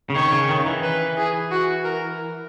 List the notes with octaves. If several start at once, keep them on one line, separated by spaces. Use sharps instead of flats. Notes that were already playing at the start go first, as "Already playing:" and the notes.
C#3
D#3 C#5
C#3
D#3
E3
B4
G#4
F#4
A#4